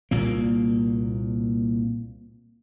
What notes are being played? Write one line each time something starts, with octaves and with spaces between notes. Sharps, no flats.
C2 A#2 A#3